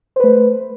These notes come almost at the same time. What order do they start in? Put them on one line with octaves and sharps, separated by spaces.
C5 B4 A3